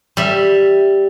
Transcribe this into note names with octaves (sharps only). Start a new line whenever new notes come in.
G3 E5